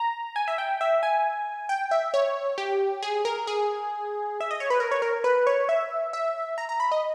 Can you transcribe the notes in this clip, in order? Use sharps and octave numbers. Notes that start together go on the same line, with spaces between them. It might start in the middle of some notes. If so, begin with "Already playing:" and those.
Already playing: A#5
G#5
E5
G5
E5
G#5
G5
E5
C#5
G4
G#4
A#4
G#4
E5
D#5
C#5
B4
A#4
C#5
A#4
B4
C#5
E5
E5
A#5
A#5
B5
D#5